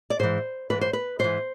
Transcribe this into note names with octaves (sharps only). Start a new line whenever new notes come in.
D5
G#2 E3 C5
G#2 E3 B4
C5
B4
G#2 E3 C5